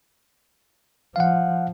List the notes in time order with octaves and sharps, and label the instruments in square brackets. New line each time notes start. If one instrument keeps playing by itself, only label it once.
[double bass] F3 [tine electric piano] F5 F#5